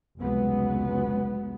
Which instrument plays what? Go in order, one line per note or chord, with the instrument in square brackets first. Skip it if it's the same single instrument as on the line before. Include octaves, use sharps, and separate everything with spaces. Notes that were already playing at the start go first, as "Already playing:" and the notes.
[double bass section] F1 C#2 F#3 G#3 B3